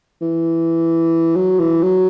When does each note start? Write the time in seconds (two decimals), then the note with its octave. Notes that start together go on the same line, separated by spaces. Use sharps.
0.21 E3
1.36 F#3
1.59 E3
1.83 F#3